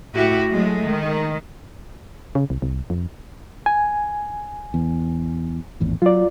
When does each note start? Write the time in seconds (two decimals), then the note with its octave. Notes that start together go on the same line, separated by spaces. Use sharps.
0.14 A2 E4 F#4 G4
0.50 F#3 G#3 A3
0.86 D#3
2.35 C#3
2.50 C2
2.62 C2
2.90 F2
3.66 G#5
4.74 E2
5.80 G#1 E2 A2
6.02 F#3 F4 D5